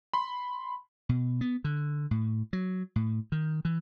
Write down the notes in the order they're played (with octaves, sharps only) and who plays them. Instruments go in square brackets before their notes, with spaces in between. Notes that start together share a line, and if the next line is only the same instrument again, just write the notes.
[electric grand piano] B5 C6
[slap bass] B2
B3
D3
A2
F#3
A2
D#3
E3